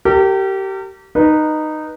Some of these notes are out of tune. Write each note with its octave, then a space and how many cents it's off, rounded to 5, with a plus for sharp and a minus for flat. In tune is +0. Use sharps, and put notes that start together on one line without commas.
G4 -25 A#4 -45
D#4 -15 B4 -15